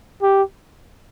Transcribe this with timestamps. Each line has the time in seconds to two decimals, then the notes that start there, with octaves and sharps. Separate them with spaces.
0.22 G4